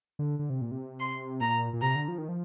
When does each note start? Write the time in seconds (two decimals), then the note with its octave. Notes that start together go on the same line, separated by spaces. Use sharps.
0.19 D3
0.39 D3
0.50 C3
0.61 A#2
0.71 C3
1.00 C6
1.41 A#2 A#5
1.73 A#2
1.81 C3 A#5
1.95 D3
2.08 F3
2.18 D#3
2.29 F3